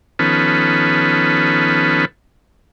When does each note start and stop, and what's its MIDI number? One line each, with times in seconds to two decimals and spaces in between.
0.19 2.05 51
0.19 2.05 53
0.19 2.05 59
0.19 2.05 61
0.19 2.05 69
0.19 2.05 71